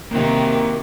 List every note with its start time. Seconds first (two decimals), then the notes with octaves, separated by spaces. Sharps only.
0.11 C3 D#3 A#3 F#4 A#4